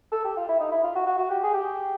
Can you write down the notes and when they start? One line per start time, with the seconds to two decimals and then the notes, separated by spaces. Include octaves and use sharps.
0.12 A4
0.25 G4
0.37 F4
0.49 E4
0.60 D#4
0.72 E4
0.84 F4
0.96 F#4
1.07 F#4
1.19 F#4
1.31 G4
1.43 G#4
1.54 G4